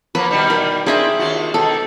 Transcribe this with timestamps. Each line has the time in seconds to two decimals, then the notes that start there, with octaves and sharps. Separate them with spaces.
0.15 F3 A#3 B3 B4
0.31 B2 D#3 G3
0.50 A#4
0.86 C4 D4 G#4 E5 G#5
1.19 D#2 F4 F#4
1.54 B2 D#3 A4